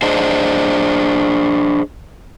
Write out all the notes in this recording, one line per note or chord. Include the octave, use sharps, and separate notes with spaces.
D4 G#4 C5 D#5